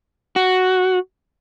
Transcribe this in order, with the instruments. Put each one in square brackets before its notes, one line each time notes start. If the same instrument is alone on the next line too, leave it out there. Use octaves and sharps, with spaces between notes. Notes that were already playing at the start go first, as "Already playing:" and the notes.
[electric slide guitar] F#4